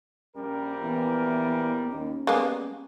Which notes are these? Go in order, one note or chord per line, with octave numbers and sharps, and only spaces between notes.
A#1 G3 C#4 A#4
E3 B3
D#2 C#4
G3 G#3 A#3 B3